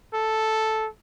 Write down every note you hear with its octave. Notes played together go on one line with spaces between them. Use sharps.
A4